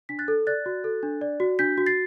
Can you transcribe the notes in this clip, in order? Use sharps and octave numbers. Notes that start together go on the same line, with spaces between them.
D4 B6
F#6 A6
A4
D5 F#6 A6
F#4
A4
D4
D5
F#4
D4 G6 B6
F#4
A6 C7